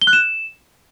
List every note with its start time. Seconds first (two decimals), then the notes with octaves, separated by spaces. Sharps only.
0.02 G7
0.07 F#6
0.13 E7